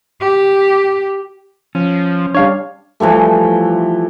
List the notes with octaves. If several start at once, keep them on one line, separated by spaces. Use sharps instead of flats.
G4
F3 C#4
G3 D4 C#5 F5
E3 F3 G3 A3